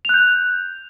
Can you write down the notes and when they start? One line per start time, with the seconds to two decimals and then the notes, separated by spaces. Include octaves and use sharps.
0.05 F7
0.09 F#6
0.14 G6